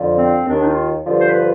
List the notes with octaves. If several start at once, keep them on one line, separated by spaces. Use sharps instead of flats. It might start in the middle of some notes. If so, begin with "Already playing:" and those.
Already playing: F2 D3 F3
C4
D#2 D#3 D4
D#4
F4
G2 D3 F3
C5
B4